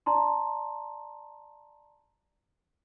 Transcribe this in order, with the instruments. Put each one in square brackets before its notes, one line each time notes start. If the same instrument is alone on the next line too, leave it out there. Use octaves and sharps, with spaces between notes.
[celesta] D5 A5 A#5 C6